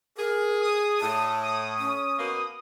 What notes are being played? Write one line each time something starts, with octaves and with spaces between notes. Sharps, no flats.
G#4 A#4
D#6
A2 A5
D#6
C#4
B2 A#3